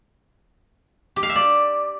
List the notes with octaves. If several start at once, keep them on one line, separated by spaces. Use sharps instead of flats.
G4
F5
E5
D5